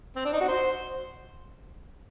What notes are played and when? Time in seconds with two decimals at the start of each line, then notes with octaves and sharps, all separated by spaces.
0.16 C4
0.25 D4
0.33 D#4
0.40 F#4
0.48 C5